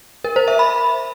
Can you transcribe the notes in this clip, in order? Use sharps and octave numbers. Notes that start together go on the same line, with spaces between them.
A#4
C5
E5
B5